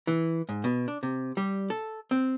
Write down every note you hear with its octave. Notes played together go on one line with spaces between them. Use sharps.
E3
G#2
B2
D4
C3
G3
A4
C4